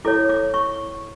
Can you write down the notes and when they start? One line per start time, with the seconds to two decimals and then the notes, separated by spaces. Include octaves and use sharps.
0.05 E4 A4 C#5 D6
0.29 D6
0.54 C#6